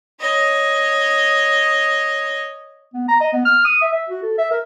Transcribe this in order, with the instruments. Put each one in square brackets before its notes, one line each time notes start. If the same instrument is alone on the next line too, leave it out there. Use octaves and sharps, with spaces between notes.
[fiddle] C#5 D#5
[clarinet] B3
A#5
D#5
B3
F6
D#6
E5
E5
F#4
A4
E5
A#4